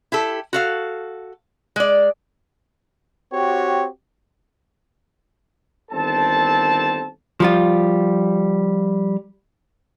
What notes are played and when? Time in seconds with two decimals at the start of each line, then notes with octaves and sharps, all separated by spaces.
0.12 E4 G4 A4
0.53 F#4 A4 F5
1.76 G#3 D5
3.33 C4 F#4 G4 C#5
5.91 G1 D#3 C4 A4 A5
7.40 F3 G3 F4